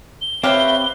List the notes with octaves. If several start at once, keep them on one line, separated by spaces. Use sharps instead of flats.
G7
C4 G4 B4 C#5 E5 F5